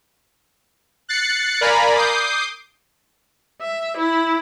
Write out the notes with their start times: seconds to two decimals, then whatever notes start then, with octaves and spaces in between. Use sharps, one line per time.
1.09 F#6 A6 C7 C#7
1.61 A#4 D5 F5 G#5 A#5 B5
1.95 D6 D#6 G6 C7
3.62 E5
3.98 E4